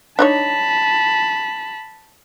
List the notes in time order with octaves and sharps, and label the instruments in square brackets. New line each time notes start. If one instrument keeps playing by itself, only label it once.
[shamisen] D4 D#4 C#5 [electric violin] A5 B5